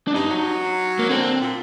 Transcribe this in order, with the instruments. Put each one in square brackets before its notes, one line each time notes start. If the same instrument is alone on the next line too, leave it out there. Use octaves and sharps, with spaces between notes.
[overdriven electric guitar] D4
[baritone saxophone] G2 [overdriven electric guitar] D#4
[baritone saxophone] F#3
[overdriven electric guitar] A#3
[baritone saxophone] D3 [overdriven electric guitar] C4
[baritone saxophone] A#2